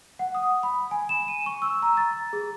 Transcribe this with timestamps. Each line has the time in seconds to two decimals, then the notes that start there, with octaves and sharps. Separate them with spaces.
0.19 F#5
0.35 D#6
0.63 B5
0.91 G#5
1.09 E7
1.28 D#7
1.46 C#6
1.62 E6
1.82 A#5
1.97 A6
2.33 G#4